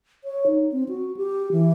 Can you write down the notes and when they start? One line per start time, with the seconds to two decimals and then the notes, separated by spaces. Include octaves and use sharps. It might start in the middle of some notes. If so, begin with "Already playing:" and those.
0.24 C#5
0.47 D#4
0.72 C4
0.89 F#4
1.17 G4
1.52 E3